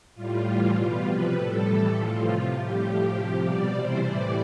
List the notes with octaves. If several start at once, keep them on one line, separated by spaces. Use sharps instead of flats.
A2 G3 F4
A2 E3 G3
B2 G3
C3 F3 B4
A2 G3 A4
A2 E3 G3
A2 F3 F4
C3 F3
A2 G3 G4
A2 F3 G4
C3 F3
B2 G3 D5
C3 E3 G3 C5
A2 E3 G3 D5